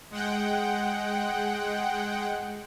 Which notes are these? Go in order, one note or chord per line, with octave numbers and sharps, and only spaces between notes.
G#3 F#5 G5